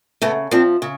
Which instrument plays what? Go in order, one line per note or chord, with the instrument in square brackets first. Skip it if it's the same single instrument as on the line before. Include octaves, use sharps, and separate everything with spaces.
[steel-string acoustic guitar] C#3 A3 B3
F3 C4 D4
C#3